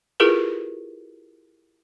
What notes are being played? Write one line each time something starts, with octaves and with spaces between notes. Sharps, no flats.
E4 F4 G4 G#4 A#4 B4